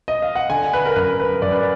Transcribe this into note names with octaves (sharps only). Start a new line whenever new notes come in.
D#5
F5
F#5
D3 G#5
B4
A#4
F#2 B4
B4
F#2 D5
B4